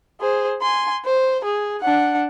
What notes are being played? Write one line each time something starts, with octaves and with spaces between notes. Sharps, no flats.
G#4 C5
G#5 C6
C5
G#4
D4 F#5